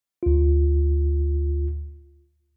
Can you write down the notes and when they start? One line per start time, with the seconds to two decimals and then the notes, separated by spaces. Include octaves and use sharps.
0.23 D2 F4